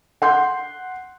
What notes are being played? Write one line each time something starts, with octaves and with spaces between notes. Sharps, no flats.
F#5 C6 G6 C7